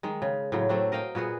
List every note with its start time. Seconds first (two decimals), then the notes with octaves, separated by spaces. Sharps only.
0.03 D#3 G#3
0.22 C#3
0.52 A2 C#3 F#3
0.69 F#3 A3 C4 D4
0.92 A#4 D#5 F5 G5
1.15 A#2 B3 F#4 G#4